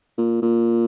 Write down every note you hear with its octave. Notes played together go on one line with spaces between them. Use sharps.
A#2
A#2